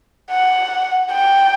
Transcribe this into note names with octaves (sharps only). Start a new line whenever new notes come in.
F#5
G5